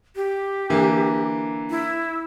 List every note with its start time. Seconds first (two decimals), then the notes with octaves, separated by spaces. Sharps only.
0.16 G4
0.70 D3 E3 A#3
1.70 E4